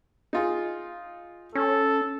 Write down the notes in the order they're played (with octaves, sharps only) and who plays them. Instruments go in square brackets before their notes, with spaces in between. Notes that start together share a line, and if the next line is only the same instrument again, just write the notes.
[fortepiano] D#4 F4 G#4
[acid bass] C#4 [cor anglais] A4